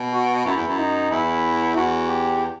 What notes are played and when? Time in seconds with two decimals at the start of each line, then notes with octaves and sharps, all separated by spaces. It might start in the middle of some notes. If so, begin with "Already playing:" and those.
Already playing: B2
0.13 F#4
0.45 F#2 E4
0.57 E2
0.68 F#2
0.78 D#4
1.11 E2 E4
1.76 E2 F#4
2.09 G4